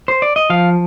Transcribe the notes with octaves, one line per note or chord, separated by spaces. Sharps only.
C5
D5
D#5
F3 F5